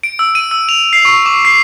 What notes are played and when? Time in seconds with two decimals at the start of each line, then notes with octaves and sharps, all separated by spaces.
0.03 D7
0.19 E6
0.35 D#7
0.51 E6
0.69 F7
0.93 C7
1.05 C#6
1.26 D6
1.45 C7